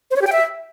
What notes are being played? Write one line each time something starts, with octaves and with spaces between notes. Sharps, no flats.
C5
C#5
G4
G5
E5